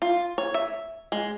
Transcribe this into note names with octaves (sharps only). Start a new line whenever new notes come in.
F4
C#5
E5
G#3